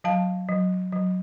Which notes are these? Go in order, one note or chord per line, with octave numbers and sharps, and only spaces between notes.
F#3 F5 A5
F#3
F#3